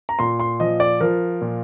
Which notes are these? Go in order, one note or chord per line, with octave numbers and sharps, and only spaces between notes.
A#5
A#2 C6
C6
F3 D#5
D5
F3 A#4
A#2